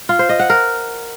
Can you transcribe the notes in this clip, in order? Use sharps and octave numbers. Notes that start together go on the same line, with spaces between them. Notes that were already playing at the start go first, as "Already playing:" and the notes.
F4
C5
D#5
F#5
A#4